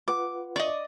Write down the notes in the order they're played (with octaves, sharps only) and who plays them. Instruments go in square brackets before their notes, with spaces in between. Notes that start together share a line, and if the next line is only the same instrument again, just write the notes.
[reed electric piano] F4 B4 F#5 [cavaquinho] D6
[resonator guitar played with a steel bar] D5 D#5 [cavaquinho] C#6